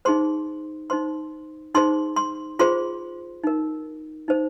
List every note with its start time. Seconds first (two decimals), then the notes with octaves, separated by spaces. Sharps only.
0.05 D#4 G#4 C5 C6
0.90 D#4 C5 C6
1.75 D#4 G#4 C5 C6
2.16 C6
2.59 F4 G#4 C5 C6
3.44 D#4 A#4
4.28 D#4 C5